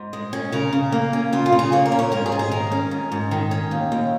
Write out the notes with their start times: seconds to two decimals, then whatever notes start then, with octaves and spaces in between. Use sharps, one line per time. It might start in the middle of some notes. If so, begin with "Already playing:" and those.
Already playing: G#2
0.13 G#3
0.33 C#4
0.52 C#3 A#4
0.73 C#3
0.92 A#3
1.13 C#4
1.33 C#3 F4
1.46 F4
1.52 C#3
1.59 G#4
1.72 A#3 C#5
1.86 A#4
1.92 C#4
1.99 C#5
2.12 G#2 A#4
2.26 G#4
2.32 G#2
2.39 G#4
2.51 D#3 A#4
2.72 C#4
2.91 G#2
3.12 G#2
3.31 D#3
3.51 C#4
3.71 D#2
3.92 D#2